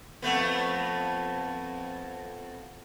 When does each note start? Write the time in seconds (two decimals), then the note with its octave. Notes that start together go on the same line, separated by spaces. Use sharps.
0.22 F2 A3 B3